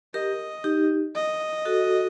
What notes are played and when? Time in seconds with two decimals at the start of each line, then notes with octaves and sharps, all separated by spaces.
0.14 G4 A#4 D#5
0.64 D#4 G4
1.15 D#5
1.65 F#4 A4